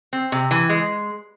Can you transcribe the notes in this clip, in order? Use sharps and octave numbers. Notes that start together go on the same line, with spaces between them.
C4
C3
E3
G#3